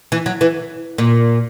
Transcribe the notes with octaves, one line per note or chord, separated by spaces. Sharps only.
E3
F#3
E3
A#2